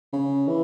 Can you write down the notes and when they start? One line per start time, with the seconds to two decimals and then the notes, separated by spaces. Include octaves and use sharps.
0.13 C#3
0.48 E3